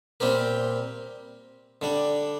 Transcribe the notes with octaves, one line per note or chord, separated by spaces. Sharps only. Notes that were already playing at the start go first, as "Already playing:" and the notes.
A#2 G3 C4 G4 A#4
D3 G3 D4